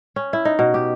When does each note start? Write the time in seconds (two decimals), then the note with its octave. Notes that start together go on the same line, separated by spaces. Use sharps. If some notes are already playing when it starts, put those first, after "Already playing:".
0.16 C#4
0.33 E4
0.45 D#4
0.59 B2
0.74 G4